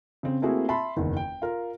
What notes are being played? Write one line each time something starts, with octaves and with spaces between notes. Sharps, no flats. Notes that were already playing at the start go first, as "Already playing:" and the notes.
C#3 C4
A3 A#3 C4 E4 F#4 G#4
E5 A5 B5 C6
F#1 E2 D#3
G5
F4 A#4